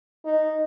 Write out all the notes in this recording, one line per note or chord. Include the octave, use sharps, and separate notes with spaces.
D#4